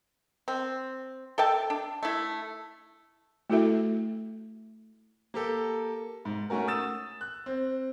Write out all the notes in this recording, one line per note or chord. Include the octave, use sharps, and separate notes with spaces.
C4
A4 E5 G5 A5
D4
A3 E4
A3 E4 F#4 A4 E5
A#3 G4 A4
G#2
A3 C#4 F#4 A#4
D#6 E6 A6 E7
F#6
C4